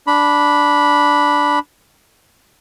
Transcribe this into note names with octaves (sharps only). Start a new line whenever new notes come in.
D4 B5